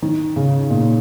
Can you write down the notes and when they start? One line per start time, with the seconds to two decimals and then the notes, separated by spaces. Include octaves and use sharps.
0.02 D#3
0.36 C#3
0.70 A#2